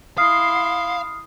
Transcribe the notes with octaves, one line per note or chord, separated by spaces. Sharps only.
E4 F5 C6 D#6 F6 C7